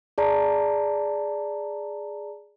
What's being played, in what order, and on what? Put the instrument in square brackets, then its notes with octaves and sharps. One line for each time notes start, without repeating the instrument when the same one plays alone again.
[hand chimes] G#4 D5 A5 A#5